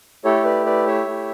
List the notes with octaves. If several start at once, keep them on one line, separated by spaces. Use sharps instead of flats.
A3 E4 G4 A4 C#5
B4 D5
B4 D5
C#5 E5
A3 E4 G4